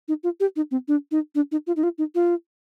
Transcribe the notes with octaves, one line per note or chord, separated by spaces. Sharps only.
D#4
F4
G4
D#4
C4
D4
D#4
D4
D#4
F4
D#4
F4
D#4
F4